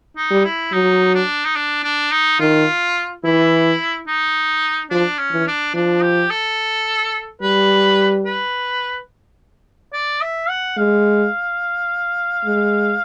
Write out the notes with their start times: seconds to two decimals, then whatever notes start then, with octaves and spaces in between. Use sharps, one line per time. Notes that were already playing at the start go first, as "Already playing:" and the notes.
0.17 D#4
0.31 G3
0.44 E4
0.72 F#3 D#4
1.14 D4
1.45 D#4
1.56 D4
1.84 D4
2.11 D#4
2.40 D#3 F4
3.24 E3 E4
4.07 D#4
4.90 F3 D4
5.18 C#4
5.32 E3
5.47 D4
5.74 F3 D4
6.02 G4
6.31 A4
7.42 G3 B4
8.25 B4
9.93 D5
10.21 E5
10.49 F#5
10.77 G#3 F5
12.45 G#3